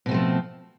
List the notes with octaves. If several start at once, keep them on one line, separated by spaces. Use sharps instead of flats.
B2 F3 A3 C4